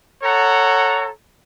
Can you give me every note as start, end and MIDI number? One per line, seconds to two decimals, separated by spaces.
0.22 1.09 69
0.22 1.09 73
0.22 1.09 78
0.22 1.09 82